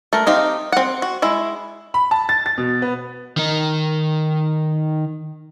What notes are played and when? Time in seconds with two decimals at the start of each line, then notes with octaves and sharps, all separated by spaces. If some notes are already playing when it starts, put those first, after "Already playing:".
0.13 A3 A#4
0.26 C4 D#4 G4 F5
0.72 C4 F#5
1.02 F#4
1.22 G#3 E4
1.94 B5
2.11 A5
2.29 A6
2.46 A6
2.58 B2
2.82 B3
3.37 D#3 D#4